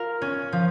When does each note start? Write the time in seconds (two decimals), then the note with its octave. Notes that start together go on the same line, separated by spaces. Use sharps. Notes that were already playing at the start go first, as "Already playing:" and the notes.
Already playing: F4 A#4
0.22 C#4
0.52 F3